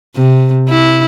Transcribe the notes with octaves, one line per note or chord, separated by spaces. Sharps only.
C3
E4